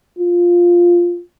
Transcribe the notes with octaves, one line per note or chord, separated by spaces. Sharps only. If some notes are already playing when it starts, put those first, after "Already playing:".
F4